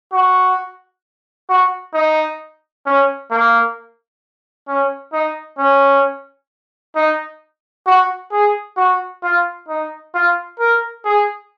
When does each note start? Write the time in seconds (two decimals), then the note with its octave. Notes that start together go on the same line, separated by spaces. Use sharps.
0.13 F#4
1.49 F#4
1.94 D#4
2.86 C#4
3.31 A#3
4.68 C#4
5.13 D#4
5.58 C#4
6.95 D#4
7.87 F#4
8.32 G#4
8.77 F#4
9.23 F4
9.69 D#4
10.14 F4
10.59 A#4
11.05 G#4